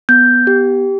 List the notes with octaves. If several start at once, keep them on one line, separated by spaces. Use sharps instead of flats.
B3 G6
G4